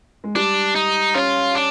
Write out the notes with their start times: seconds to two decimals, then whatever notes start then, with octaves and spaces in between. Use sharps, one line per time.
0.24 G#3
0.35 G3 D4
0.75 D#4
1.14 C#4 F4
1.55 D4